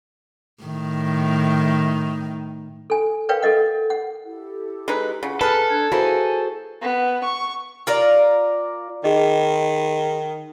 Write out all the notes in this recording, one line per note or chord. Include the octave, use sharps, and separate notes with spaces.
A2 D#3
A4 G#5
A#4 B4 C#5 F5 G5
A4 A#4 D#5 F#5
F#5
E4 G4 A4
G#3 D#4 B4
C#3 F4 F#5
G#4 A4 B4 A5 A#5 F6
D4 F#6 G#6
A#3 E4 F#4 G#4 B4 C5 G#5
B3
C#6
F4 A#4 D5
D#3 G#4 D#5